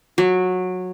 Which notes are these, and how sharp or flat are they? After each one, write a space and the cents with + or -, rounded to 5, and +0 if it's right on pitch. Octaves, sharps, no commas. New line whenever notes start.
F#3 -15